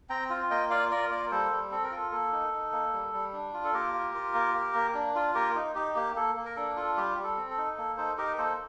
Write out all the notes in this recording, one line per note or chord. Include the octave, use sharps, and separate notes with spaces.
C4 G5 A#5
F4
A#3 D#5 G5
F4 D5 F5
F4 A#4 D5
A#3 A#4 D5
G3 A4 C5
G3
C4 A4
A#4
F4 A4
A#3 A4
D#4
D#4
A#3
G3
G3
D4
F4
A4
A#3 G4 A#4
F4
F4
A#3
A#3
A#3
D4
F4
A#3 G4 A#4
D#4
D#4 G4
A#3 G4
A#3 A4
A#3
A#4
D4 A4
F4 A4
G3 G4
G3
A4
C4
A4
D#4
A#3 A4
D#4 A4 C5
D#4 G4 A#4
A#3 A4 C5